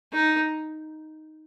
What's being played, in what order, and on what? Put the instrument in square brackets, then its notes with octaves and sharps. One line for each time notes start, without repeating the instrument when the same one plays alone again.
[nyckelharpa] D#4